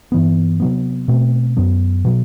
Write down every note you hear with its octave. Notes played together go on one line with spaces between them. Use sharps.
G2 E3 B3
C3 F#3 B3
B2 A3 C4
F#2 F#3 B3
B2 F#3